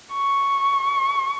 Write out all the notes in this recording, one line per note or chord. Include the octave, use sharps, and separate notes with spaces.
C#6